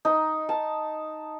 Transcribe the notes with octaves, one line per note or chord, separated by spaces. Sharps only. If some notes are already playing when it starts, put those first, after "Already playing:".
D#4
A5